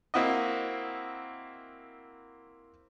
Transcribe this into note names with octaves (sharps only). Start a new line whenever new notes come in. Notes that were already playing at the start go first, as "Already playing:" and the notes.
A#3 C4 E4 F#4 D#5